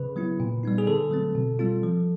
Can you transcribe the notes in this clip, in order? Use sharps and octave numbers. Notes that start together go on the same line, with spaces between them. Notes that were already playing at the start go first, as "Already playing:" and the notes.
Already playing: C#3 B4
F#3 B3 E4
A#2
G3 B3 D#4
G#4
D3 A4
F#3 A3 C4
B2
G3 C4 F4
F3